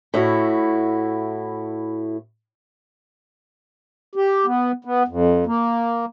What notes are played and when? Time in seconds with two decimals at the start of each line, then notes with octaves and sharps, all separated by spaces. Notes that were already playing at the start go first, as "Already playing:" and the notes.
0.14 A2 E4 F#4
4.15 G4
4.46 B3
4.85 B3
5.08 F2
5.46 A#3